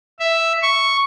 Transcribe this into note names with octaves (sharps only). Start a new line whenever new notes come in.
E5
C#6